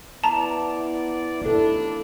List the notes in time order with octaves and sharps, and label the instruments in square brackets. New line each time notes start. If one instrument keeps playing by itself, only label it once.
[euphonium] B3 [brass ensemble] E4 D5 [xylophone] A5 A#5
[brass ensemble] D#2 D4 [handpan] E4 A4